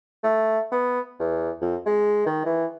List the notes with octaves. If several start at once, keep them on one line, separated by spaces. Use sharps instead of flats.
A3
B3
E2
F2
G#3
D#3
E3